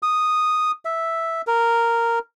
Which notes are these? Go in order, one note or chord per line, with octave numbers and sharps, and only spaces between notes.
D#6
E5
A#4